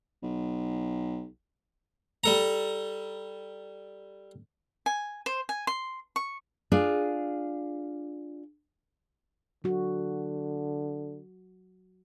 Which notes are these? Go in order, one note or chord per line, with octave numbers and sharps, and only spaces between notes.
B1
G3 A4 A#5
G#5
C5
G#5
C6
C#6
D4 F4 G#4
D3 F#3 F#4